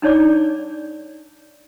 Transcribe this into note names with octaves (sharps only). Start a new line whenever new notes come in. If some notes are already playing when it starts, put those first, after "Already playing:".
D4 D#4 C#5 D5 D6